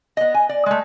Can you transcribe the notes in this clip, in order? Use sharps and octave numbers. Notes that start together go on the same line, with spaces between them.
B3 D#5
G#5
D5
G#3 A3